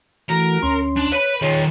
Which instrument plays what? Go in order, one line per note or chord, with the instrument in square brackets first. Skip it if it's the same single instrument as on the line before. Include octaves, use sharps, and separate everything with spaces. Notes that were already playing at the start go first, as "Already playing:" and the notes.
[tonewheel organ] E3 A3 F#4 [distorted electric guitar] A#4
[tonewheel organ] D2 C#4 C6
[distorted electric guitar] D4
[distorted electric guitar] B4 B5 [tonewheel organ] C#5
[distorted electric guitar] D#3 F4 [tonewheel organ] G#4 C#5